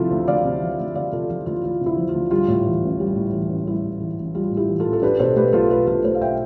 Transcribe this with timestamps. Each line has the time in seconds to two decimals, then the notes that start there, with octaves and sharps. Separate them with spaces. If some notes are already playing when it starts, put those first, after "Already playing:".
Already playing: D2 C3 F3 E4 F4 G4 A4
0.11 D2
0.28 D2 D5 F5
0.44 C3
0.62 F3
0.79 D2
0.95 D2 D5 F5
1.12 C3 F4 A4
1.30 F3 F4
1.46 D2 F4
1.64 D2 F4
1.81 C3
1.86 E4
1.98 F3
2.09 F4
2.14 D2
2.31 G3 F4
2.48 A2
2.66 E3
2.83 A1
3.00 G3
3.15 A2
3.33 E3
3.49 A1
3.67 G3 E4
3.84 A2
4.00 E3
4.18 A1
4.34 G3 F4
4.51 A2
4.57 E4 G4
4.69 E3
4.80 F4 A4
4.86 A1
4.93 A4
5.02 D4 G4 B4
5.19 B2 A4 C5
5.36 A3 G4 B4
5.53 B1 F4 A4
5.70 D4 G4 B4
5.87 B2 F4 A4
6.04 A3 A4 C5
6.15 F5
6.21 E5 G5